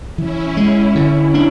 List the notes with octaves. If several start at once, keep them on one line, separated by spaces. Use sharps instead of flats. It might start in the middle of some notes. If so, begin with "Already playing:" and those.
E3 C#4 E4
G#3
D3
D4